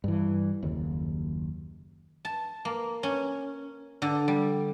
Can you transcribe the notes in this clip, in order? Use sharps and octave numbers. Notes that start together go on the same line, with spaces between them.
G2 E3
F#1 D#2
A5
A#3
C#4
D3
G3